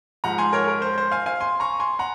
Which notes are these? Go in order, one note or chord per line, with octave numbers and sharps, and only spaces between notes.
G#2 F3 F#5 A#5
G#5 C6
A#4 C#5
A#4
C5
C5
F5 G#5
F5 G#5
G#5 C6
A#5 C#6
G#5 C6
F#5 A#5